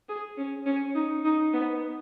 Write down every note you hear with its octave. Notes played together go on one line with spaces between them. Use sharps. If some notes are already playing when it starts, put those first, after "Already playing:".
G#4
C#4
C#4
D#4
D#4
B3